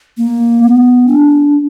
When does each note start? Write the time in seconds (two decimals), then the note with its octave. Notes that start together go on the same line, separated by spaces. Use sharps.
0.18 A#3
0.62 B3
1.07 D4